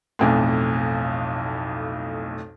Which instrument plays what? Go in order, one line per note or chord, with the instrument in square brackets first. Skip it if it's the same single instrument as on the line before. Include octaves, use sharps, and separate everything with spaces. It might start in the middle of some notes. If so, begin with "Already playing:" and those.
[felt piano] B1 F2 A2